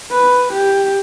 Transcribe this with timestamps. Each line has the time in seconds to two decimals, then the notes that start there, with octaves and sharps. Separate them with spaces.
0.12 B4
0.53 G4